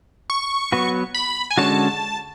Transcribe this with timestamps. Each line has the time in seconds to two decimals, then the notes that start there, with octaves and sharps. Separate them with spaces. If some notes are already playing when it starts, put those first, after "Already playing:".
0.30 C#6
0.72 F#3 B3 F#4 B4
1.14 B5
1.50 G#5
1.58 D3 G#3 C#4 F#4 C#5 A5